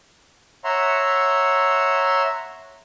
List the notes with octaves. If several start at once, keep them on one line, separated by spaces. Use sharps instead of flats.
C#5 E5 F#5 A#5 C6